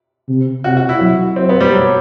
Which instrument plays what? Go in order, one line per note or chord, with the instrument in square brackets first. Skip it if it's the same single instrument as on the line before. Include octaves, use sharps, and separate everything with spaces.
[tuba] C3
[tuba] C3 [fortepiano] F#4
[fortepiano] F#4
E4
[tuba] F#3
[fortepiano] C4
B3
G3
F#3